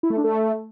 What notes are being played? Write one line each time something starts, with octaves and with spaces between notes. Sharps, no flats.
E4
A3
D4
A3